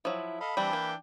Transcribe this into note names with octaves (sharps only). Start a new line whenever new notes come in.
F3 F#3 E4
A4 D#5 F5 B5
E3 G3 C4 D4 G5
A#3